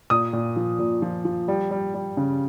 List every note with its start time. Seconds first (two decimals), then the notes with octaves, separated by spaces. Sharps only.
0.10 A#2 D#6
0.33 A#2
0.56 F3
0.79 A#2
1.02 F3
1.25 F3
1.48 G3
1.71 G3
1.94 G3
2.17 C#3